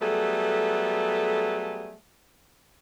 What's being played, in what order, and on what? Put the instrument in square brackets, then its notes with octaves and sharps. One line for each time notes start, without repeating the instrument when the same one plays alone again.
[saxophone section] F#3 G3 A3 B3 G#4 A4